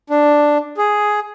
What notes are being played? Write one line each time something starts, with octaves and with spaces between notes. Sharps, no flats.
D4
G#4